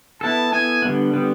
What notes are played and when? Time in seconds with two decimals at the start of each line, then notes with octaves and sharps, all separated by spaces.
0.21 B3 E4 A4 A5
0.52 B3 E4 A4 G#5
0.82 D3 G3 B3
1.13 D3 G3 B3